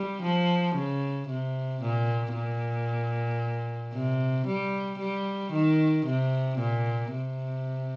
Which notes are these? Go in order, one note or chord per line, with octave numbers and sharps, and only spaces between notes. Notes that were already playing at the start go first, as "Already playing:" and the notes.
Already playing: G3
F3
C#3
C3
A#2
A#2
C3
G3
G3
D#3
C3
A#2
C3